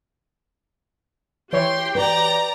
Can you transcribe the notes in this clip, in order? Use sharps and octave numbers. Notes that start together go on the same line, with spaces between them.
E3 G4 C#5 G5 C6
B4 D5 A#5